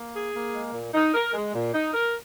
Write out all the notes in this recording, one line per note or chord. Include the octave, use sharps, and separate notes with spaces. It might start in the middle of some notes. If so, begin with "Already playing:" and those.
Already playing: A#3
G#4
A#3
G#3
A#2
D#4
A#4
G#3
A#2
D#4
A#4